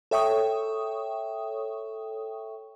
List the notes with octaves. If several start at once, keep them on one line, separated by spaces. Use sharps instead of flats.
A4 C#5 E5 G5 C#6 D#6